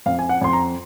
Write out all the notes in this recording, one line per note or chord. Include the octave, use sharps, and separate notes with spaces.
F2 F5
G#5
F#5
F2 C6
A#5